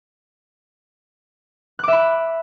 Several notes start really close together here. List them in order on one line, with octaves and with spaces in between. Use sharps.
F#6 D6 E5 B5